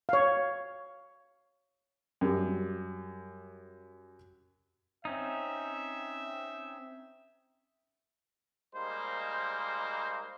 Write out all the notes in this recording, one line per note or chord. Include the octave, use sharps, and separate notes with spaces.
C#5 F5
F#2 G3 G4
C4 C#4 D#4 E5
G3 G#3 A#3 D#4 C5